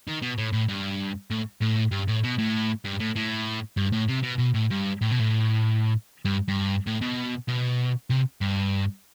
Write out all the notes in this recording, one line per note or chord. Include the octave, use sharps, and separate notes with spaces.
D#3
B2
A2
A2
G2
A2
A2
G2
A2
B2
A2
G2
A2
A2
G2
A2
C3
B2
B2
A2
G2
A2
B2
A2
G2
G2
A2
B2
B2
C3
G2